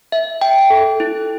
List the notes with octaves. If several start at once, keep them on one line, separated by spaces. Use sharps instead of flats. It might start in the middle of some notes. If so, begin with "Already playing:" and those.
E5
G5
A4
E4